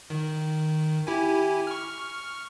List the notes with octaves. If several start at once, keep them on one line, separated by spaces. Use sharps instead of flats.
D#3
E4 G4 G#5
C#6 F6